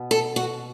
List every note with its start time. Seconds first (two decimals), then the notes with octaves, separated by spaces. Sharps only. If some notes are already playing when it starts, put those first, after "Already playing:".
Already playing: B2
0.11 A4
0.36 F#4